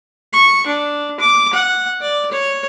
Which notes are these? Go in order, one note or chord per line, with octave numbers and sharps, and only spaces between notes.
C#6
D4
D6
F#5
D5
C#5